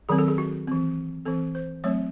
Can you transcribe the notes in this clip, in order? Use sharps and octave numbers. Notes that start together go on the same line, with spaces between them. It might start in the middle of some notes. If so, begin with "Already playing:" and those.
D#3 F#3 C4 G#4
A4
G#4
F#4
E3 C4
E3 C4 A4
C5
F#3 A3 C4 C#5